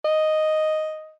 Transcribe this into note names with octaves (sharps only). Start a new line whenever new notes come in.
D#5